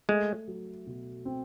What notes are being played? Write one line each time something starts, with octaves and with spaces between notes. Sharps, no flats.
G#3 A3
F#3
B2
C4